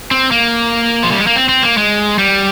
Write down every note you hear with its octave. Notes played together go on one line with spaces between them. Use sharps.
C4
A#3
F3
G3
G#3
A#3
C4
C4
A#3
G#3
G3